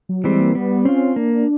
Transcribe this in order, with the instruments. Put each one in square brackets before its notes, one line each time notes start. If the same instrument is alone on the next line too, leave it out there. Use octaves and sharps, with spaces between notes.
[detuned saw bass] F#3
[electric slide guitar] E3 G3 C4 [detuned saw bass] G#3
[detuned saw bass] A#3
[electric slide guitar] G3 [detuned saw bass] B3
[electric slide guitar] C4 F4 [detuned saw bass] C#4
[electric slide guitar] A#3 [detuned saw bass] D4